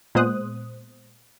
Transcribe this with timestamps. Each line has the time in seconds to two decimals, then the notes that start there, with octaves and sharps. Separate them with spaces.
0.15 A#2 G#3 B3 C5 D#6 F#6